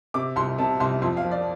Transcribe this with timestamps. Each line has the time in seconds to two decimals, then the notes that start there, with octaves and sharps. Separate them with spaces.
0.14 C3 D6
0.36 C2 C6
0.58 C3 A5
0.80 C2 C6
1.02 F2 C6
1.17 F5
1.24 F3
1.31 D5